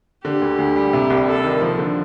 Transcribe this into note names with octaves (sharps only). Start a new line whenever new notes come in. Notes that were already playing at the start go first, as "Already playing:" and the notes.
D3 G4
D2
D2
G3
C3
C2
G3 A4
D#3
F3
D3